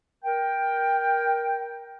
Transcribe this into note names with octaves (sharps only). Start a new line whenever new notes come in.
A#4 G5